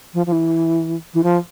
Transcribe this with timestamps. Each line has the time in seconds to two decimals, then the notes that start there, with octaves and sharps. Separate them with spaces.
0.14 F3
0.26 F3
0.32 E3
1.14 E3
1.23 F3